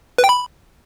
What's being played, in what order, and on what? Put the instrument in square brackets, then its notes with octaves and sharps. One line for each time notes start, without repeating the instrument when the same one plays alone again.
[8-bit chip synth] B4
G5
B5